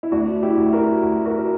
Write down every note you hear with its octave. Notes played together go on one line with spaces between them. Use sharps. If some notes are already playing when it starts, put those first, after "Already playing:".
E4
D2 D4 F#4
E4 G4
D2
F#4 A#4
D2
F#4 A#4
A#4